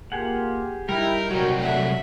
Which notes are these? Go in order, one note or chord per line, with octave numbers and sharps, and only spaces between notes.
A#3 F4 G4 G#4 F#5
G3 D#4 E4 G4 A#4 G5
C2 F#3 F#4 A#4 C#5
A3 D4 E5 F#5